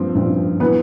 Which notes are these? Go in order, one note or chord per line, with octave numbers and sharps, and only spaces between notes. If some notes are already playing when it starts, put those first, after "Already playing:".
Already playing: G2 F3 C4
G2 F3 C4
E3 B3 B4